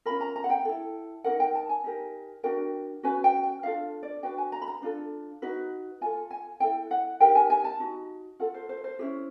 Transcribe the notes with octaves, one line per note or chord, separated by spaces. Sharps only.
C#4 F4 A#4 B5
A#5
A#5
F#5
G5
E4 A4
D#4 F#4 A#4 F#5
G5
A5
G#5
D#4 G4 A#4
D4 F#4 A#4 G5
C#4 F#4 B4 G#5
G5
G5
D4 F4 A4 F5
D5
D4 F#4 B4 G5
G#5
A#5
B5
A#5
D4 F4 A4
D#4 F#4 B4
F4 A4 G#5
G#5
E4 A4 G5
F#5
D#4 G4 A#4 G5
G#5
G#5
A5
D#4 F#4
F4 A4 F#5
C5
C5
C5
C#4 E4 G4